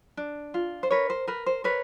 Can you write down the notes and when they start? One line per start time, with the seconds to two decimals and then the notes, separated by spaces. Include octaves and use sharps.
0.17 D4
0.54 F4
0.83 C5
0.91 A#4 B4 C#5
1.10 C5
1.27 A#4 B4
1.46 C5
1.64 A#4 B4 C#5